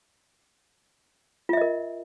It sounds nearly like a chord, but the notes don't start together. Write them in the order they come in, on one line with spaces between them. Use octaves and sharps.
F4 E5 D#5 A#4